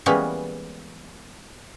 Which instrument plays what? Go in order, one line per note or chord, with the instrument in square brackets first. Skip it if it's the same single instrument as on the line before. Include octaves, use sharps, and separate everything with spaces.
[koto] E3 G3 G#3 A#3 B3 C#4